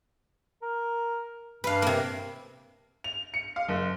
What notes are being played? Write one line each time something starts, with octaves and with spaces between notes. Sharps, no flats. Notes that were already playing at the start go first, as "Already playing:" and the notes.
A#4
G2 B4 F5
C3 A#3
F7
C#7
F5
F#1